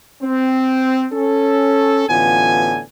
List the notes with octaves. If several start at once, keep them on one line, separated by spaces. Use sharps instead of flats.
C4
C#4 A4
A1 A2 D3 B3 F4 G#5